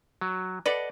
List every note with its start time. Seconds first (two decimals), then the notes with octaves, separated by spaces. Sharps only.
0.21 F#3
0.66 A4 B4 D5 D#5 F#5